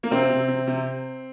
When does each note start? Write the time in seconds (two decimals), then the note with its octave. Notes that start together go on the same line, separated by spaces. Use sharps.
0.03 A#3
0.11 C3 C4
0.29 C3
0.48 C3
0.67 C3